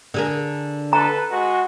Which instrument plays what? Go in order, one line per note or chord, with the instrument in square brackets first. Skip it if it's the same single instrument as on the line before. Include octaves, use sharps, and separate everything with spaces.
[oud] D3 G#4 A#4
[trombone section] A4 B4 [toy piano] A#5
[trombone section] G#3 F#4